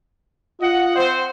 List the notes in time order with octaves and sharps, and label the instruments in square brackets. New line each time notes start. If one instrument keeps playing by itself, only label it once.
[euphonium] F4 [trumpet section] D#5 F#5
[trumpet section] C4 C5